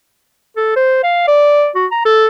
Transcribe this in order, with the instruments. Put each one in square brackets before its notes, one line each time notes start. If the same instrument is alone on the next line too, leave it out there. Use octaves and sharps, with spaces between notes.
[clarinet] A4
C5
F5
D5
F#4
A#5
A4